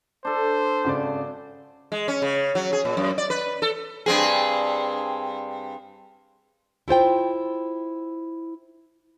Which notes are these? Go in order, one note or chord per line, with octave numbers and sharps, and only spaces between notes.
D4 A4 C5
G#1 C#3 D5
G#3
C#4
C#3
F#3
G#4
A#2
F#2
D5
B4
A4
G2 C4 G#4
E4 F4 C5 G5